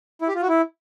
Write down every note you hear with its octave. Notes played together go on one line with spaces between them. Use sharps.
E4
G4
F4
F#4
E4